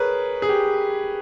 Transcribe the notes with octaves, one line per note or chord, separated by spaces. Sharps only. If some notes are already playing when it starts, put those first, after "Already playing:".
Already playing: G#4 A#4 B4 C#5
G#4
G4